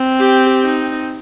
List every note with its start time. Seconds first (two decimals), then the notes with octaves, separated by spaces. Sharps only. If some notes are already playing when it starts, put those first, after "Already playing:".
Already playing: C4
0.19 G4
0.64 D#4